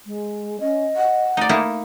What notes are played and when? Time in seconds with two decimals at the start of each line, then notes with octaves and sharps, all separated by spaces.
0.06 G#3
0.60 C#4 D#5
0.96 F#5
1.37 A3 D#4 D5
1.49 A#3 D#4 E4